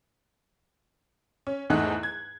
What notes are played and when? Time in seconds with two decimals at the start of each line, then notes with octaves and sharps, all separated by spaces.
1.47 C#4
1.70 E2 G#2 A3 D#4 F#6
2.03 G#6